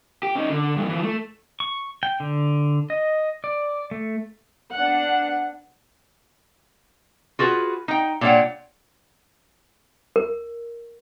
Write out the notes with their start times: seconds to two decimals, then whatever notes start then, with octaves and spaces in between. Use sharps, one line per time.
0.23 G4
0.35 C#4 D#4
0.49 D3
0.76 G2 E3
0.89 E3 F3
1.04 A3
1.60 C#6
2.03 G5
2.20 D3
2.90 D#5
3.44 D5
3.91 A3
4.72 B3 D4 F#5
7.39 F4 F#4 G#4 B4
7.88 D#4 G5
8.21 A#2 G3 D4 C#5 F#5 G5
10.16 A#4